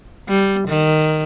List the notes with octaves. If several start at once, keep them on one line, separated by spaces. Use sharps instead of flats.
G3
D#3